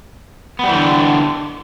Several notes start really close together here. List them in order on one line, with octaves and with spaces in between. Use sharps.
B3 G3 E3 D3